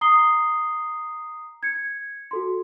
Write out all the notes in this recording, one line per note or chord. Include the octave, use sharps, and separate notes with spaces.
A#5 D#6 C7 G7
G#6 C#7
F#4 A4 C6